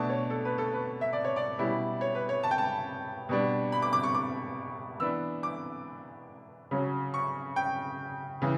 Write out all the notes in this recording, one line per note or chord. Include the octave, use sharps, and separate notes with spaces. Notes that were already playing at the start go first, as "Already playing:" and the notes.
Already playing: B2 A3 D4 A5
C#5
A4
B4
A4
B4
E5
D5
C#5
D5
B2 G3 C#4 E4
C#5
B4
C#5
A5
G5
A5
B2 G3 D4
B5
D6
D6
C#6
D6
E3 B3 D4 E6
D6
C#3 F#3 C#4
C#6
G5
C#3 E3